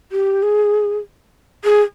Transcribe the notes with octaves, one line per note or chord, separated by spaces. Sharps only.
G4
G#4
G#4